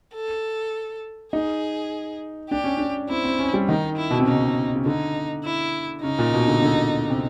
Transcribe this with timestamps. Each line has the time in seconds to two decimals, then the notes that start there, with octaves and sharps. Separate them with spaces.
0.15 A4
1.33 D#4 G#4
2.50 D4 G4
2.64 C#4
2.77 D4
3.09 C4 E4
3.25 C4
3.39 C#4
3.54 G3
3.68 D#3 D#4
3.97 E4
4.10 B2
4.19 C3
4.27 C#3 D#4
4.76 C#3
4.86 D3 D#4
5.44 E4
6.03 C#3 D#4
6.19 A#2
6.34 B2
6.48 D3
6.62 D3
7.10 C3